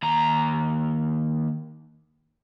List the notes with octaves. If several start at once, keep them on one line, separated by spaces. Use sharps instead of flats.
D#2 A#5